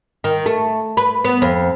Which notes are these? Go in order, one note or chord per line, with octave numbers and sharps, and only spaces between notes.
D#3
A3
B4
B3
F2